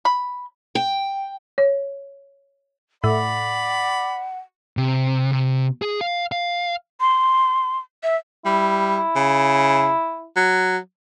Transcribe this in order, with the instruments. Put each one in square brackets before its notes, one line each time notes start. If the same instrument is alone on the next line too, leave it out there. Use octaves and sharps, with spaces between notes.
[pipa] B5
[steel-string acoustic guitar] G5
[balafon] C#5
[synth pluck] A2 [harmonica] D5 B5 [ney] F#5
[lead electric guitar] C3
C3
G#4
F5
F5
[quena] C6
E5
[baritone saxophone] G3 [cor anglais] E4
[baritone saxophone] C#3
F#3